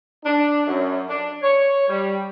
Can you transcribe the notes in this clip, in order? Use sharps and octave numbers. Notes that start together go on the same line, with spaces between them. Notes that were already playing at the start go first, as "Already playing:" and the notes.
D4
F#2
D4
C#5
G3